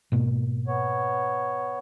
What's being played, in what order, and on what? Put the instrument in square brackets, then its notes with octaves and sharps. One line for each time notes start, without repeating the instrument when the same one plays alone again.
[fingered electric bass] G#2 B2 A#3
[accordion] B3 C#5